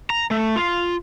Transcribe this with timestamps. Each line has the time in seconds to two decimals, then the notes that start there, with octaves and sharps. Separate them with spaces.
0.10 A#5
0.31 A3
0.56 F4